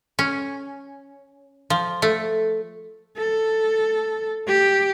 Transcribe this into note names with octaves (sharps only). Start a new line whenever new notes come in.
C#4
F3
A3
A4
G4